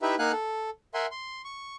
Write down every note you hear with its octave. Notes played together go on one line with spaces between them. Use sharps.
D#4 E4 G4 B4 E5
A#3 D#4 F5 F#5 G#5 F#6
A4
A#4 E5 F#5 G#5 C6
C6
C#6